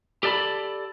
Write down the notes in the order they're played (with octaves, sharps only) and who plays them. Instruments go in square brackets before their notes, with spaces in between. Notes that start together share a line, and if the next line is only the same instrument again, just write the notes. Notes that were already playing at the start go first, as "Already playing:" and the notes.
[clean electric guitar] G4 A4 D5 A5 B5